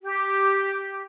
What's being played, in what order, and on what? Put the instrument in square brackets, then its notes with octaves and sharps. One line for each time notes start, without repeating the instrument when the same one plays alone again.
[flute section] G4